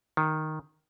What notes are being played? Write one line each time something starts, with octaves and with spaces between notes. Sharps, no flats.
D#3